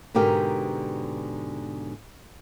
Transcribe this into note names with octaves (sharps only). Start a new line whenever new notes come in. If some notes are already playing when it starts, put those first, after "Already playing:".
G#2 B2 D3 G4 A#4